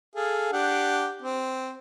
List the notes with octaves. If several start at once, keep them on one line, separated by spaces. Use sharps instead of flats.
G#4 A4 F5
D4 G4 F#5
C4